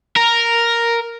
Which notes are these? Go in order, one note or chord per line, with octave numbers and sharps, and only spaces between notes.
A#4